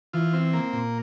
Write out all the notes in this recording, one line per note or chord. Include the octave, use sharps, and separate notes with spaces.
E3 F4
C4
A#3
A#2